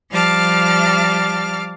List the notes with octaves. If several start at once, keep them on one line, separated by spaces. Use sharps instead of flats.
F3 G3 F5 A5 D6 F6